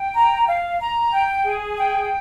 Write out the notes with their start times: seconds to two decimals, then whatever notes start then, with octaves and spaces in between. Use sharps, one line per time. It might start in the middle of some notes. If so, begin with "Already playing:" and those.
Already playing: G5
0.15 A#5
0.47 F5
0.80 A#5
1.12 G5
1.44 G#4
1.77 G5